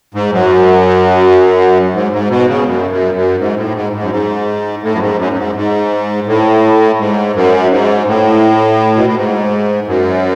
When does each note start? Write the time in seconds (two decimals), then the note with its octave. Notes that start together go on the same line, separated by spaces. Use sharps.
0.14 G#2
0.32 F#2
1.94 G#2
2.12 G#2
2.30 B2
2.48 C#3
2.66 F#2
2.90 F#2
3.14 F#2
3.39 G#2
3.57 A2
3.74 G#2
3.93 G#2
4.02 F#2
4.11 G#2
4.83 A2
4.94 F#2
5.01 G#2
5.18 F#2
5.33 F#2
5.37 G#2
5.55 G#2
6.27 A2
6.99 G#2
7.35 F#2
7.71 G#2
8.08 A2
8.97 B2
9.06 A2
9.15 G#2
9.87 F#2